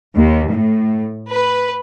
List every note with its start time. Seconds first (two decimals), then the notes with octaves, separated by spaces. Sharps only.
0.14 D#2
0.51 A2
1.31 B4